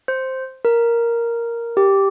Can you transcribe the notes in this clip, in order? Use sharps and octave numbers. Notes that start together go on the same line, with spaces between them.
C5
A#4
G4